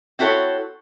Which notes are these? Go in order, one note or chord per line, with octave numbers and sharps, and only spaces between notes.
C4 E4 F#4 A4 C#5